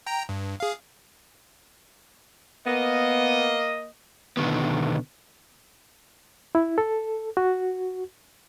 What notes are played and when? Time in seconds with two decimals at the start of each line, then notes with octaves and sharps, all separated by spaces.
0.06 G5 A#5
0.29 G2
0.60 G#4 F5
2.66 A#3 B3 D#5
4.37 B2 D3 D#3 B3
6.55 E4
6.78 A4
7.37 F#4